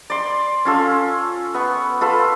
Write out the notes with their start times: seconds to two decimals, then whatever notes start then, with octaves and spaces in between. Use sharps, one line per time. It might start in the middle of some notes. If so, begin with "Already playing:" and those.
0.10 D5 C6
0.65 C#4 F4 A4
1.54 B3 C#6
2.01 F4 A4 B4